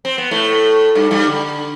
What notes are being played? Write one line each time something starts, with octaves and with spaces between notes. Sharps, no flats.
C4
B3
A2 A3
G2 G3
G2 G3
D3